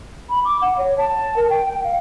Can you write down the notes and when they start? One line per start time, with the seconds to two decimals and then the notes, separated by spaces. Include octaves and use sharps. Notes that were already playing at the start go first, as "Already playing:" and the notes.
0.29 B5
0.44 D6
0.61 F#5
0.78 C#5
0.97 A5
1.36 A#4
1.49 G5
1.65 G5
1.83 F5